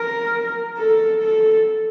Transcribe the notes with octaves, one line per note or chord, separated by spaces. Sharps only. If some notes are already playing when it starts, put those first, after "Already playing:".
Already playing: A#4
A4
A4